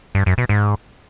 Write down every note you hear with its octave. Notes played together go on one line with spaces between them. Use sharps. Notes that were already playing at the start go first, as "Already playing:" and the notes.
G2
F#2
B2
G#2